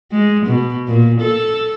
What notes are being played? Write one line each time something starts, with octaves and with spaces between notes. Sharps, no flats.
G#3
B2
A#2
A4